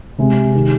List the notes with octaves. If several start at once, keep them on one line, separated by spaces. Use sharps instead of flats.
C3 G#3 C4
C3 D#3